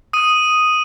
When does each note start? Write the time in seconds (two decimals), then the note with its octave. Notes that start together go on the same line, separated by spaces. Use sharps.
0.13 D#6 D#7